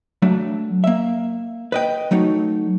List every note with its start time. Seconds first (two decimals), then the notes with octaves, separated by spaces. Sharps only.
0.22 F#3 A3 D4
0.84 A#3 E5
1.72 B4 D#5 G5
2.11 F#3 A3 D#4 C#5